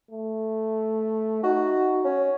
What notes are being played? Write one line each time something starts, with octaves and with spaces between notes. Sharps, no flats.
A3
D#4 F#4
C#4